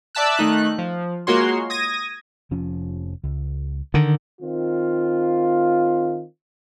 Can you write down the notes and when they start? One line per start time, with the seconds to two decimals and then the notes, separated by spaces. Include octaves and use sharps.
0.15 D5 E5 A5 E6 F#6
0.37 D#3 A3 D#4 F#6
0.78 F3
1.27 G#3 A#3 F4 F#4 C#5 C6
1.70 D#6 G#6 A#6 D#7
2.51 F1 F3 C#4
3.24 C#2
3.94 D3 D#3
4.42 D#3 C4 F4